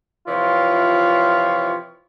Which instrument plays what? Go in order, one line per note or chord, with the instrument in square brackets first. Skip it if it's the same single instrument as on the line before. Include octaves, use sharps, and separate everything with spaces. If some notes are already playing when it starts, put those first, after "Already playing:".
[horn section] C3 E3 F3 F4 C#5